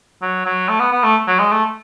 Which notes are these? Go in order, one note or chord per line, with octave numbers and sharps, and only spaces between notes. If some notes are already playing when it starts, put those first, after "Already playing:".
F#3
F#3
A3
B3
B3
A3
F#3
G#3
A3